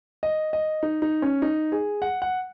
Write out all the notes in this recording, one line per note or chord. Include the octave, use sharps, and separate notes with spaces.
D#5
D#5
D#4
D#4
C#4
D#4
G#4
F#5
F#5